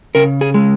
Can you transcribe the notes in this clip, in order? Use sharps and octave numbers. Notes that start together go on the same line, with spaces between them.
C#3 A#4
G#4
G#3